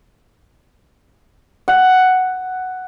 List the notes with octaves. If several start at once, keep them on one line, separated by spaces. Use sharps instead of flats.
F#5